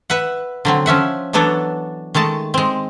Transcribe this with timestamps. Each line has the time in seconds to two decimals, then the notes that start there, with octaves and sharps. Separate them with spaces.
0.10 B4 E5 F#5
0.65 D3 F#3 C4
0.86 F3 C#4 E5 F#5
1.33 E3 F#3 B3 D4 A4 C#5
2.14 D#3 G#3 A3 A5
2.54 G#3 C4